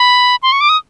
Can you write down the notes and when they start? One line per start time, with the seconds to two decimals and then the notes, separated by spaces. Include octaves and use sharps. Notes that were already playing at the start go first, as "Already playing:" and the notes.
Already playing: B5
0.43 C6
0.52 C#6
0.61 D6
0.69 D#6